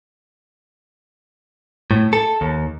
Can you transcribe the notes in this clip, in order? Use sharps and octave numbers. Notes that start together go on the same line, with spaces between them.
A2
A4
D#2